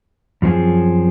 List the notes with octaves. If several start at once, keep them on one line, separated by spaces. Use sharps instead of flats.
F#2 F3 C4 F4 G#4